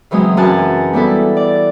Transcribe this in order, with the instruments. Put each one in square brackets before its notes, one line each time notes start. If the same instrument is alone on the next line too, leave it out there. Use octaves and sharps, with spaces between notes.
[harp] C#3 E3 F#3 G#3 C4 D#6
F#2 E3 G#3 G#5 A5 F#6
G3 B3 E4 A4
D5